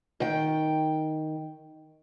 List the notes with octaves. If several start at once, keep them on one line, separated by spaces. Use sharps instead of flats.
D#3 G5